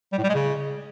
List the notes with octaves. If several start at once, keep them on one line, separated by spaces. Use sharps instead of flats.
G3
A2
G3
G#3
C#3